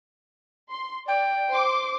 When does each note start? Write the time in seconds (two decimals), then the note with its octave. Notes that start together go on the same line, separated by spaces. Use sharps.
0.70 C6
1.08 D5 G5
1.50 C5 C6 D6